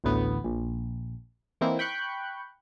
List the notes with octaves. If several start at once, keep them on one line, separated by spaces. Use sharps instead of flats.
A1 D2 A2 B3
A#1
E3 A#3 C4 D#4 E4
G5 B5 C#6 F#6 G6